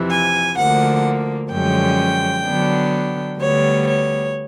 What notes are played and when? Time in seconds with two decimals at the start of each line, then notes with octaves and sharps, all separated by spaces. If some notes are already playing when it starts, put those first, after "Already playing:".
Already playing: F2 C3 E3
0.10 G#5
0.57 D2 D3 F3 A#3 F#5
1.50 F#2 D3 F3 G#3 C#4 G5
2.44 D3 F#3 B3 D4
3.39 D2 D3 G3 B3 C#5
3.86 C#5